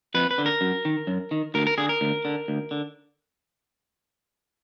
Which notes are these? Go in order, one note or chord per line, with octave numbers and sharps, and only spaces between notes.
F2 B4
B4
D3
A#4
F#2
D#3
F#2
D#3
D2 A#4
A#4
D3 G#4
A#4
D2
D3
D2
D3